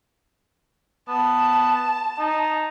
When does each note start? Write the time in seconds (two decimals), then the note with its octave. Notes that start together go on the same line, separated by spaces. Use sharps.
1.08 B3 A5
2.19 D#4